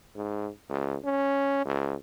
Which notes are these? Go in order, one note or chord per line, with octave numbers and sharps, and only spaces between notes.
G#2
C#2
C#4
C#2